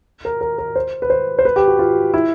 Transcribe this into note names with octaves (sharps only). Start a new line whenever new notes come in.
A#4
A#4
A#4
C5
B4
C5
C5
B4
G4
F#4
F4
E4